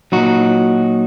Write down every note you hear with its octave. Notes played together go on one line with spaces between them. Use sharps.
A#2 F#3 D#4 F#4